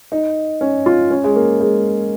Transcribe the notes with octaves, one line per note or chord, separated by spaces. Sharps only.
D#4
C#4
F4
C#4
G#3
A#3
G#3